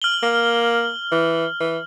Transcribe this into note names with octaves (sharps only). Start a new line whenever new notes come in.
F6 F#7 G7
A#3
E3
E3